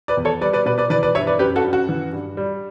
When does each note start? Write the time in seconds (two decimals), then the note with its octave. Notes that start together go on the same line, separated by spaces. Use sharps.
0.08 B4 D5
0.17 E2
0.25 A4 C#5
0.41 G3 B4 D5
0.53 B4 D5
0.65 B2 B4 D5
0.78 B4 D5
0.90 E3 B4 D5
1.03 B4 D5
1.15 G2 C#5 E5
1.27 B4 D5
1.39 F#2 G4 B4
1.56 F#4 A4
1.64 F#2
1.73 F#4
1.89 E3
2.13 G2
2.37 G3